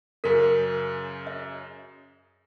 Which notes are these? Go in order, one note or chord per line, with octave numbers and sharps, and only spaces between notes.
F#2 C#3 A#4 B6
E5